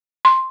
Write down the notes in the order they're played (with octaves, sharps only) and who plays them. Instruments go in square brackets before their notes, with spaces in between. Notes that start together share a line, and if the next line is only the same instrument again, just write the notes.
[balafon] C6